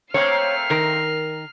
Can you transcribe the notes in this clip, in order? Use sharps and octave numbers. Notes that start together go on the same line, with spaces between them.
A3 A#3 C4 C#5 F6 C7
D#3 A#4